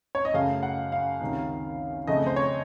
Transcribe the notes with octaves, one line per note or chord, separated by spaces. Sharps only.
C#5
D#5
F#2 C#3 A3 F5
F#5
F5
C#2 C3 D#3
F2 C#3 A3 D#5
C5
C#5